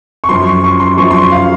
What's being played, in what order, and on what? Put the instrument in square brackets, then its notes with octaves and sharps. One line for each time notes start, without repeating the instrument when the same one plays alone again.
[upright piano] C#6
F#2 F3 C6
C#6
C#6
C6
F#2 F3 C#6
C6
C#6
F5